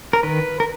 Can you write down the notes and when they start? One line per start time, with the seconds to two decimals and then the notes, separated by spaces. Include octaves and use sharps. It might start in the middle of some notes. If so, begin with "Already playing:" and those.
0.13 A#4
0.23 D#3 B4
0.60 A#4